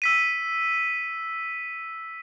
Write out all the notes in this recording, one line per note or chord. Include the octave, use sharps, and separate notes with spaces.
E6 B6 D#7